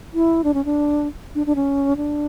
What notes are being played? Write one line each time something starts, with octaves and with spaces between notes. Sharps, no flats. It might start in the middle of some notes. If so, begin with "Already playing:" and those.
E4
D4
C#4
D4
D4
D4
C#4
D4